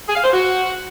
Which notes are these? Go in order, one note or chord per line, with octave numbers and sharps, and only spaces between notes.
G#4
F5
C5
F#4